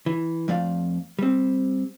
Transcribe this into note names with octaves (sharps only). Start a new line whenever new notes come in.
E3
F2 F3 A3 D5 F5
G3 C4